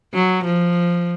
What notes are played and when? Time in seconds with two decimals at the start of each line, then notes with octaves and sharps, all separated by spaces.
0.14 F#3
0.45 F3